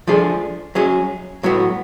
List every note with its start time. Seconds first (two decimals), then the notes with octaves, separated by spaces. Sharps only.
0.07 F3 A3 D4 G#4
0.75 F#3 C#4 G#4
1.43 A2 F#3 B3